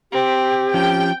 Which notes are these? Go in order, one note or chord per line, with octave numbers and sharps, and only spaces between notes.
C4 G4
F3 C#4 G5